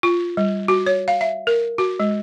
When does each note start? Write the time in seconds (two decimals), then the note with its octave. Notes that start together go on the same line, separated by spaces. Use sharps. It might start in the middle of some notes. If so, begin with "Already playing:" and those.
0.03 F4
0.37 G3
0.68 F#4
0.86 C#5
1.08 F5
1.21 E5
1.47 A#4
1.78 F#4
2.00 G#3